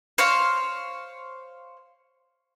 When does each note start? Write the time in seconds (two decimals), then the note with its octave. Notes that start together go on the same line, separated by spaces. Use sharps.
0.18 C5 C#5 F5